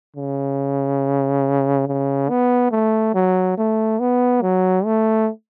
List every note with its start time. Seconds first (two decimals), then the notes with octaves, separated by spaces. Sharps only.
0.17 C#3
1.88 C#3
2.30 B3
2.72 A3
3.15 F#3
3.58 A3
4.00 B3
4.42 F#3
4.85 A3